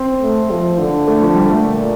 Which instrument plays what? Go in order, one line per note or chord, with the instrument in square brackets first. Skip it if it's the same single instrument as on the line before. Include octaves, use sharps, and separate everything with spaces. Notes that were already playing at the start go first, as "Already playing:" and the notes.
Already playing: [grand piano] C4
[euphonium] A3
F3
D3
[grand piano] A3
F3
G3
A3
[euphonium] A#2